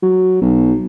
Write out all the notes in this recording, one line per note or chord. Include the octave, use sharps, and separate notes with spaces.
F#3
B1